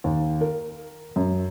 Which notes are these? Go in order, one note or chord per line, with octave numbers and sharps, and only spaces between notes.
D#2
A#4
F#2